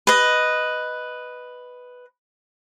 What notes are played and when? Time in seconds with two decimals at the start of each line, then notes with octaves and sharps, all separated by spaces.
0.07 B4 D#5